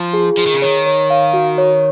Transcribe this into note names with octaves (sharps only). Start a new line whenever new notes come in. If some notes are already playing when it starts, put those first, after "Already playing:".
Already playing: F3 F4
G#4
F3 G#4
D#3
C#3
D#3 C#5
C#5
F5
F#4
C#5